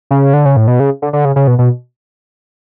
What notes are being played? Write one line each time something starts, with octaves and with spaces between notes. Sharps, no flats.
C#3
D3
C#3
A2
B2
C#3
D3
D3
C#3
C#3
B2
B2